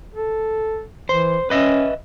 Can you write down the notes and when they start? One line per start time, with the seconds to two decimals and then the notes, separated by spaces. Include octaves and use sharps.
0.14 A4
1.09 E3 C5
1.50 C#4 B4 D#5 E5